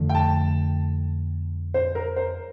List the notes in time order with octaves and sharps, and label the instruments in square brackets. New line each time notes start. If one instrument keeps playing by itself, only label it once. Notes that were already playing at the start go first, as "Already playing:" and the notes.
Already playing: [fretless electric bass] F2 D3 F3 A3
[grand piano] G5
A5
C5
A#4
C5